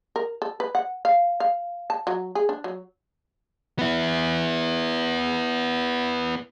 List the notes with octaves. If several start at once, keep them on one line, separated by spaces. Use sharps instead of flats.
A#4
A4
B4
F#5
F5
F5
A5
F#3
G#4
D4
F#3
B3 E4